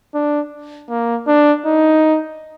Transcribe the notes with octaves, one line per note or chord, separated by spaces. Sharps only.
D4
A#3
D4
D#4